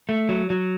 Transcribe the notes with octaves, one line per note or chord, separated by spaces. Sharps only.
A3
F#3
F#3